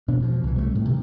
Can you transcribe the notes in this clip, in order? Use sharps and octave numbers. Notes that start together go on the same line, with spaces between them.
E1 B2 D4
B2 F3
C2 A#2 E3
C2 F3 A3
A2
C3 D#3 F3